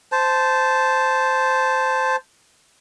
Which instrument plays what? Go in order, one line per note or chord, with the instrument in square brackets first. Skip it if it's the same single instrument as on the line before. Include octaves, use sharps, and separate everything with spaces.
[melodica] C5 A5